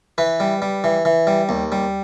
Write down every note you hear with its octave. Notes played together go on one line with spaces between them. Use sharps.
E3 B4
G3
G3
E3
E3
G3
D#2
G3